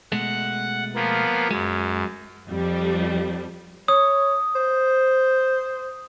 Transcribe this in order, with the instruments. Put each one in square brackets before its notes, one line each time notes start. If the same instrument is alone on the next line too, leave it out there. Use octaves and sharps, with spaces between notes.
[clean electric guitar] B2 G#3 A3 [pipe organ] F#5
[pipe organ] F3 A#3 B3
[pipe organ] F#2 [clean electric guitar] G#3
[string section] F2 G3
[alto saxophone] C#5 [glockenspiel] D#6
[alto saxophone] C5